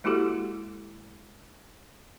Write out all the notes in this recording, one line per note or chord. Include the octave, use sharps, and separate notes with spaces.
G#3 A#3 E4 F#4 G4 A4